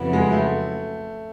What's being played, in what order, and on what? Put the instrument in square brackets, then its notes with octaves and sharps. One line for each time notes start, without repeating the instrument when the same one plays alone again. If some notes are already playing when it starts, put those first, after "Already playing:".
Already playing: [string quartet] F2 C#3 F#3 B3 E4
[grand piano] G#3
A3